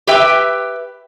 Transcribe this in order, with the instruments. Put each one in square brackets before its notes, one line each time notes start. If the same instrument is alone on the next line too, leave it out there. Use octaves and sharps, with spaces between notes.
[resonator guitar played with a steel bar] G4 B4 E5 G5